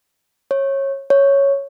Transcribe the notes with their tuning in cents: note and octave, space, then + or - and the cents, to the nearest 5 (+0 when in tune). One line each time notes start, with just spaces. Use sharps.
C#5 -20
C#5 +0